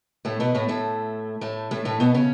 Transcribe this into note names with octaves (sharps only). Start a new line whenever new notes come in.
A2 A3
B2 B3
A2 A3
A2 A3
A2 A3
A2 A3
A2 A3
B2 B3
C#3 C#4